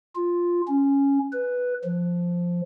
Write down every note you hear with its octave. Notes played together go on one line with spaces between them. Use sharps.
F4
C#4
B4
F3